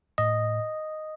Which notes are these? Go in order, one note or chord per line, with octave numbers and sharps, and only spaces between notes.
A2 D#5